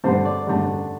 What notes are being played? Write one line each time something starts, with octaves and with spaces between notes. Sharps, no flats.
G2 D3 A3 C5
D5
G2 D3 A3